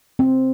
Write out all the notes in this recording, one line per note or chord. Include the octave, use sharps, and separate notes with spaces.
C4